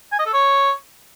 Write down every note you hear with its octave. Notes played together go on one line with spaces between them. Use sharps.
G#5
D#5
A4
C#5